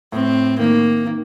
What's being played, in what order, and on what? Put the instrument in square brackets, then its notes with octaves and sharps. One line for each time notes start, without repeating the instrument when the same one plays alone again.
[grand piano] A2 [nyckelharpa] C4
[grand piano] D#3 [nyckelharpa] A#3
[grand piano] D#3